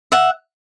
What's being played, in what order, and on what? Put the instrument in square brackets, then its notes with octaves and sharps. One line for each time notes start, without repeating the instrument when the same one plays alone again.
[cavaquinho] E5 F#5